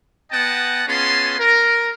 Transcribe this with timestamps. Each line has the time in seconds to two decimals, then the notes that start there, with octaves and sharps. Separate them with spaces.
0.32 B3 D#5 F#5 G5 A5
0.87 B3 C#4 F4 G#4 A5 C6
1.40 A#4